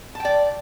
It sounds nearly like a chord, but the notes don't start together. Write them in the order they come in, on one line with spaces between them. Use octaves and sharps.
A5 G5 D5